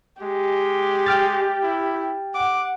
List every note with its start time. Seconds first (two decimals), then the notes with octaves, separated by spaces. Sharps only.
0.22 G#3 G4
1.06 G5 F6 A6
1.63 E4
2.34 F#5 D6